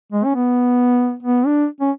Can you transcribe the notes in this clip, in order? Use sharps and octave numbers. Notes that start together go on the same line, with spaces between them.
G#3
C#4
B3
B3
D4
C#4